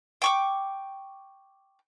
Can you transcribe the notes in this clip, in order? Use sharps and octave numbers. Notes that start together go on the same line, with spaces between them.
G5 C#6 D6